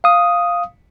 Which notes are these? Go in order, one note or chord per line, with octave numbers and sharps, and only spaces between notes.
F5 D#6